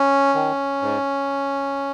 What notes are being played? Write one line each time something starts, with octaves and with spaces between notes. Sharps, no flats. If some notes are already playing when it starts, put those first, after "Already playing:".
Already playing: C#4
D#3
G#2